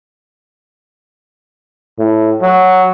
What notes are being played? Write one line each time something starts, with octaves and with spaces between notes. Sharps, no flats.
A2
F#3